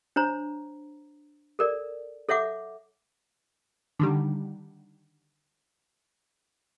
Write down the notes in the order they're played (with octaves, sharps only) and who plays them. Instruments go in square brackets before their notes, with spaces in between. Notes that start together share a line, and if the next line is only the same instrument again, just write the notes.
[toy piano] D4 C5 C#5 A#5
A4 A#4 D5
A4 C#5 E5 F#5 D6
[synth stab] D3 D#3 G3